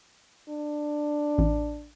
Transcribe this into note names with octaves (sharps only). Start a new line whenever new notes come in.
D4
A1